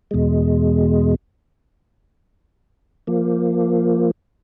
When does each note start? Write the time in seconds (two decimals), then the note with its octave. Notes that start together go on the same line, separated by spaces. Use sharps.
0.11 E2 B2 G#3
3.07 F3 A#3